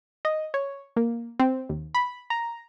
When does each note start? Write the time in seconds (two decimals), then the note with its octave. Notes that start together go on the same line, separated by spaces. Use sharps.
0.25 D#5
0.54 C#5
0.96 A#3
1.40 C4
1.69 D#2
1.95 B5
2.30 A#5